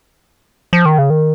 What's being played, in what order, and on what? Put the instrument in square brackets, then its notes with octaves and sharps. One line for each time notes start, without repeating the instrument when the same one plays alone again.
[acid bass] F3
D#3
C#3
D#3